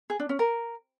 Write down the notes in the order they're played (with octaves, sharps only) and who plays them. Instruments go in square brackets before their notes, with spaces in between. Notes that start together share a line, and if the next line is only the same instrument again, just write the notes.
[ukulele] G#4
D4
C#4
A#4